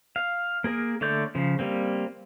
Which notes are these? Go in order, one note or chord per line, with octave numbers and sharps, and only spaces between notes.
F5
A#3 G#4 A#4
D3 A3 C#5 D5 G6
C#3 F3
G3 A#3 C4